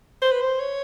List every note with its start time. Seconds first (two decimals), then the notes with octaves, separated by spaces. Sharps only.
0.22 C5
0.32 B4
0.41 C5
0.60 C#5